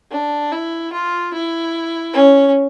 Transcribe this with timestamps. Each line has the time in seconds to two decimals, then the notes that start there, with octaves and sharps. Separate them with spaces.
0.11 D4
0.52 E4
0.93 F4
1.33 E4
2.13 C#4